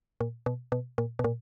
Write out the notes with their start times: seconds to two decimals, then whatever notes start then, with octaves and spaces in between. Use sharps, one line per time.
0.20 A#2
0.46 B2
0.72 B2
0.98 A#2
1.19 B2
1.24 A#2